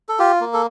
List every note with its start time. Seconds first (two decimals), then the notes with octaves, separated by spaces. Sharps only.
0.09 A4
0.19 F4 G4
0.41 A#3
0.54 A4